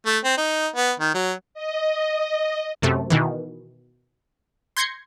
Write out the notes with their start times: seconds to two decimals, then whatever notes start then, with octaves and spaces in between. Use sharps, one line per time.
0.06 A3
0.24 C4
0.37 D#4
0.76 B3
1.00 D#3
1.14 F#3
1.54 D#5
2.82 F#2 C3 A3
3.10 B2 D#3 E3
4.77 C6 G6 G#6 A#6 C7 C#7